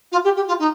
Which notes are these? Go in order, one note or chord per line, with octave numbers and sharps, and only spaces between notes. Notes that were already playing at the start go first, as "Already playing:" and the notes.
F4
G4
G4
F4
D#4